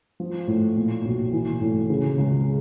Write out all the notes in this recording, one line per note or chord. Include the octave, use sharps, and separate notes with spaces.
F3
A2
A#2
B1
E3
A2
C#3
C#2